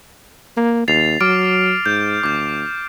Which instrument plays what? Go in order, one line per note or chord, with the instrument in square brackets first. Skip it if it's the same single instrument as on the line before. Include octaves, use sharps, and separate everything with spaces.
[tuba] A#3
[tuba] D#2 [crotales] A6 C7 F7
[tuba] F#3 [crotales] D6 F6 D7
[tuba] G#2 [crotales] G6
[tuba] D2 [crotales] D6 G6